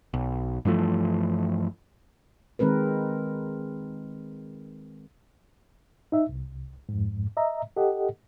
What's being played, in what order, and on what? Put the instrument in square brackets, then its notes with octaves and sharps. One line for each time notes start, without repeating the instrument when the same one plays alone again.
[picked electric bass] B1
G2 E3 F3 A3
[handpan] D#3 G#3 C4 A#4 B4
[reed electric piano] D#4 E5
C2
F2 G#2
D#5 E5 A#5
G4 A4 D#5 F#5